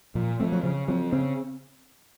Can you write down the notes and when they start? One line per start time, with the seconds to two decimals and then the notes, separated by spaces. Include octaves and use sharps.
0.15 A#2 F3
0.40 F3 A3 C4
0.52 F#3
0.63 C#3 F3
0.88 F3 F#3 C4
1.12 C#3 C4